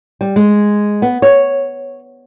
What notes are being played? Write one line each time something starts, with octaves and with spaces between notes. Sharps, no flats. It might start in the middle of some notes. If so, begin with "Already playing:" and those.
G3
G#3
B3
C#5